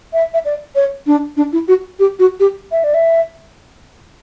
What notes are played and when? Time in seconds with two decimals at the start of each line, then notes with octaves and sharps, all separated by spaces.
0.13 E5
0.34 E5
0.45 D5
0.75 C#5
1.07 D4
1.37 D4
1.53 E4
1.68 F#4
1.99 G4
2.19 F#4
2.40 G4
2.72 E5
2.84 D5
2.94 E5